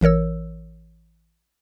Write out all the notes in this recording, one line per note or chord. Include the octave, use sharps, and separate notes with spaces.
A1 E3 A#4 C#5 E6